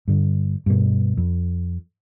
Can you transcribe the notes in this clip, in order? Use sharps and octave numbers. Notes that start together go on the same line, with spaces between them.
G2 D3
G2 B2
F2